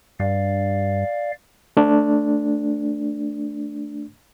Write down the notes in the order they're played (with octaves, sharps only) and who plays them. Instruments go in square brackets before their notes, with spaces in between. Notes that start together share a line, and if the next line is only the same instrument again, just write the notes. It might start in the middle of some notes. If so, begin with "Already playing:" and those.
[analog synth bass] G2 [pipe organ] D5 F5
[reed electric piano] A3 D4